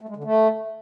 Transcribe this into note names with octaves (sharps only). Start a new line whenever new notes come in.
A3
G#3
D3
A3